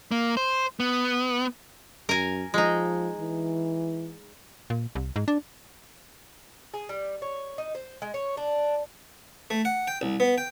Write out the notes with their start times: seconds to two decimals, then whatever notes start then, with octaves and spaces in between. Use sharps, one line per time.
0.11 A#3
0.37 C5
0.80 B3
2.09 F#2 A#4 G#5
2.54 F3 G#3 D#4
3.19 E3
4.70 A#2
4.95 C2
5.16 G#2
5.28 D4
6.74 G#4
6.89 G3
7.22 C#5
7.58 D#4
7.75 C5
8.02 G#3
8.14 C#5
8.37 D4
9.50 A3
9.65 F#5
9.88 G5
10.02 C2
10.20 B3
10.38 G5